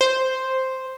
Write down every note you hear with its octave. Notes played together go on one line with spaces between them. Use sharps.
C5